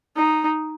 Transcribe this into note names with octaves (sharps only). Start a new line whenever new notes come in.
D#4